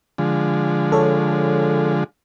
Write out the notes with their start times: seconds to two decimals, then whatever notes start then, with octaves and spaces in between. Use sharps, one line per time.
0.18 D3 F3 G#3
0.92 A4 C#5